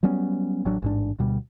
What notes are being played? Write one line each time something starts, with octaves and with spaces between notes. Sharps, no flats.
F#3 G3 B3 C#4
A1 F#3 D4
A1 G#2 D4
D2 B2 G3